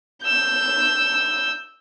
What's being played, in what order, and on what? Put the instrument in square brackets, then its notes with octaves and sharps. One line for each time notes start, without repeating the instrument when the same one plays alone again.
[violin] E6 G6